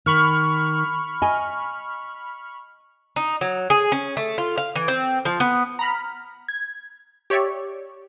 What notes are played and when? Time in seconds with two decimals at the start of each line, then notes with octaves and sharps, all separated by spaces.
0.06 D#3 B5 C#6 F6
1.22 D#5 G#5
3.16 D#4
3.41 F#3
3.70 G#4
3.92 C#4
4.17 A3
4.38 F4
4.58 F5
4.75 E3
4.88 C4
5.25 F3
5.40 B3
5.79 A#5 B5 F6
6.48 G#6
7.30 G4 C#5 D5 E5